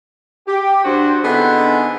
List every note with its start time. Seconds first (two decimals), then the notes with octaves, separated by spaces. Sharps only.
0.47 G4
0.84 G2 F#4 C5
1.23 D3 B3 C4 D#4 E4 G#4